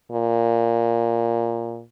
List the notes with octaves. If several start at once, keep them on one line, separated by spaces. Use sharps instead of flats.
A#2